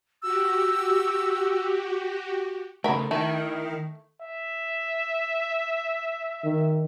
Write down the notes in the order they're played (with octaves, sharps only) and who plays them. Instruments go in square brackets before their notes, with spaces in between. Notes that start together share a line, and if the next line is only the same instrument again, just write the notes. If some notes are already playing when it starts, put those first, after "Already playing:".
[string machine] F#4 G4 [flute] E6
[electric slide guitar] C#3 A3 [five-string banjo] A#4 B5
[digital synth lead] D#3 [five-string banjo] A3 [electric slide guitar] E4
[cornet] E5
[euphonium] D#3